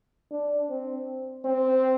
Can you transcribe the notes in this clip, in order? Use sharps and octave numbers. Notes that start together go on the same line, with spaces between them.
D4
C4
C4